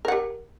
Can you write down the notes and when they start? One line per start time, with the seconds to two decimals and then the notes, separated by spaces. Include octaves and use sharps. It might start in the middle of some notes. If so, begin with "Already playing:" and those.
0.05 A#4
0.08 F#5
0.12 G4